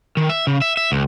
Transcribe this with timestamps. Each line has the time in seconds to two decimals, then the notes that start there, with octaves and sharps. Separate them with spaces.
0.17 D#3
0.29 E5
0.47 C#3
0.62 E5
0.77 E5
0.92 C#2